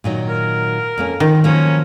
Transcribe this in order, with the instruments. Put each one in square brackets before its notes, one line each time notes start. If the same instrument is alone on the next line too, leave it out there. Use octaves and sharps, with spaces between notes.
[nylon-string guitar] A#2 D#3 F#3
[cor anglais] A#4
[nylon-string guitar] F2 A#3 C#4
[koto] D#3 [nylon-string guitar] F3
[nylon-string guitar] F3 F#3 A#3 [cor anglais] C#4